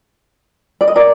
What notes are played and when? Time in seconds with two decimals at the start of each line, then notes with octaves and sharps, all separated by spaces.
0.81 D5
0.88 D#5
0.96 A#4 D5